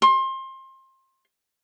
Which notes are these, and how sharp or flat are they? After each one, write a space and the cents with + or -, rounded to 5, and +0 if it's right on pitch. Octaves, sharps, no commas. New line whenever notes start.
C6 +25